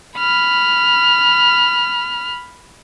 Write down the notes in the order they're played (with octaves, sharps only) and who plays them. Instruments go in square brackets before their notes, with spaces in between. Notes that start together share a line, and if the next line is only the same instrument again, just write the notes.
[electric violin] B5 F6